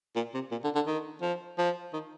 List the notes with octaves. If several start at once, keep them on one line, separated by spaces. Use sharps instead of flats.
A#2
C3
A#2
D3
D3
D#3
F3
F3
D#3